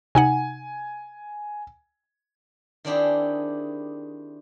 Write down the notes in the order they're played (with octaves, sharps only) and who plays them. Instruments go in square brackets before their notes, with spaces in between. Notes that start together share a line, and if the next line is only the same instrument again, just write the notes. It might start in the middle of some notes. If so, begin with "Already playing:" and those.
[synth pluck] C3 D#4 F#5 [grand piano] G#5
[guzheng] D#3 C4 D4 E4 G4 G#4